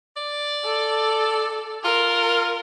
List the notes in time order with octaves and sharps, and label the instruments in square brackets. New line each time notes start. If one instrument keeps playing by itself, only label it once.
[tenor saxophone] D5
[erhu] A4
[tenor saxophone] F4 [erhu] A#4